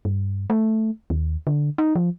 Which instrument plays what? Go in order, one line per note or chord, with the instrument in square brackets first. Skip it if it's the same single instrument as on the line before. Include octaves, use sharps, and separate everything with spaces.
[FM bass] G2
A3
D#2
D3
D#4
F3